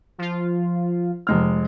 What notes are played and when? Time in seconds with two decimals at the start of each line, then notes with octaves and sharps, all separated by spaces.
0.18 F3 F4
1.27 F1 G#3 F6